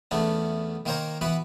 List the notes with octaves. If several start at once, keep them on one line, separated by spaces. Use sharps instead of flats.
E2 A3 B3 C#4 D4
D#3 A#3 A#4 C5 C#5 A#5
E3 B3 F#4 B4